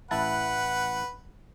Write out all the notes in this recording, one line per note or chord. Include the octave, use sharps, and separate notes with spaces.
A1 E4 B4 F#5 A5